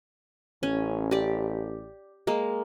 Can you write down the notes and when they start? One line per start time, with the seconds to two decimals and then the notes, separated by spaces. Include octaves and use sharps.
0.63 A1 C#4
1.11 G4 D5
2.27 G#3 A#3